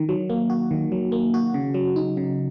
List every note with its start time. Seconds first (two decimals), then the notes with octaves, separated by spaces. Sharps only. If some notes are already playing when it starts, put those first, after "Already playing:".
Already playing: D#3
0.09 F#3
0.30 A#3
0.50 F#4
0.71 D#3
0.92 F#3
1.12 A#3
1.34 F#4
1.54 C#3
1.74 F#3
1.96 D#4
2.17 C#3